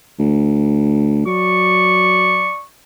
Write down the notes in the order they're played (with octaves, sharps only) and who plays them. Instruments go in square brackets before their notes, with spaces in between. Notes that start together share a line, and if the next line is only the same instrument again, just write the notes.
[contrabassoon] D2
[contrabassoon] F#3 [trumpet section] D5 C#6